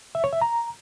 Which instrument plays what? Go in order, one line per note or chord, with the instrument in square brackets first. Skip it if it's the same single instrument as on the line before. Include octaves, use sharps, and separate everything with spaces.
[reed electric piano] E5
C#5
E5
A#5